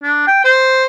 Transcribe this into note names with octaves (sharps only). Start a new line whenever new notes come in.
D4
G5
C5